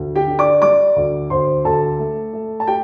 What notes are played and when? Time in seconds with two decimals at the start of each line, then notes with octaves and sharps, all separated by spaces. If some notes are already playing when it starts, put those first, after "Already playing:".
Already playing: D2
0.15 G4 G5
0.27 D3
0.39 D5 D6
0.62 G3 D5 D6
0.96 D2
1.30 D2 C5 C6
1.65 D2 A4 A5
1.99 A3
2.33 A3
2.60 A5
2.67 G4 G5